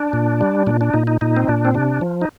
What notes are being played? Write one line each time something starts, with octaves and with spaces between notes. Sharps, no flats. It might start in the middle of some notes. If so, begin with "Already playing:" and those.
Already playing: D4
A#2
G3
A#2 D4
D4
A#2 D#4
D#4
A#2 D#4
C4
A#2 D4
C4
C3 D4
F3
D#4